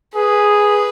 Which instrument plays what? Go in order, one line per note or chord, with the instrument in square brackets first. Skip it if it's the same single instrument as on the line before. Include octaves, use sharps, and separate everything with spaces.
[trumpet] G#4 [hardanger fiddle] B4